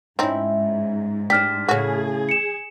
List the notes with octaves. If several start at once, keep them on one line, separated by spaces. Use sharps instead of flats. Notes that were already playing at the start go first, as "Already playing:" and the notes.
G#2 C4 C#4 D#4 E4
D4 G4 C5 F6 B6
A2 C#3 C#4 F#4 G#4
C#7 E7